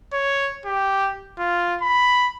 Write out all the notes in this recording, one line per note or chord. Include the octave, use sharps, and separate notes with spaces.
C#5
G4
F4
B5